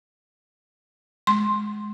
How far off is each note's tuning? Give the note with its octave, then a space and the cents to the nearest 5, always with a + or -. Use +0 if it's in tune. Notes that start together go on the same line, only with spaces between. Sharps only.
G#3 +10 C6 +15